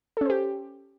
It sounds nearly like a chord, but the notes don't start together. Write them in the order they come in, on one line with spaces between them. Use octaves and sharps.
A4 C#4 C5 G4